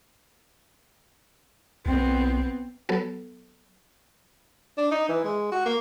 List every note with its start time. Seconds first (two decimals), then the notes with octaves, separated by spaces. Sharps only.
1.86 B1 B3 C4
2.89 F#3 B3 A4
4.78 D4
4.91 D#4
5.09 E3
5.24 G#3
5.52 F#4
5.65 A#3